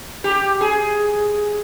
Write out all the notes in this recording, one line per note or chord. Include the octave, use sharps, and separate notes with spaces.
G4
G#4